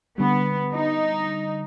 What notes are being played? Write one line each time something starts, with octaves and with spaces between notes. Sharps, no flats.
D3 G3 B3
D#4